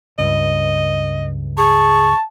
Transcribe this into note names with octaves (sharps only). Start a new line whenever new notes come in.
C#2 G2 D#5
G#4 A5 C#6